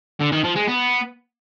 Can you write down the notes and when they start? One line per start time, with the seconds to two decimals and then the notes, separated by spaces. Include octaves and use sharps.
0.20 D3
0.32 D#3
0.44 F3
0.56 G#3
0.67 B3